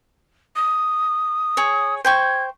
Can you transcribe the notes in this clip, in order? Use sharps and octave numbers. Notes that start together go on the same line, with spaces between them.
D#6
G#4 C#5
C5 G5 C#6 G#6